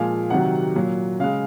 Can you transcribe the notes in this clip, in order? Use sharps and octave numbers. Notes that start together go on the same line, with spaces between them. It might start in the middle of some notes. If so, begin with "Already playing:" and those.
Already playing: A#2 F3 G#3 F5 G#5
C3 D#3 F#3 F#5
A#2 F#3
C#3 G#3 F5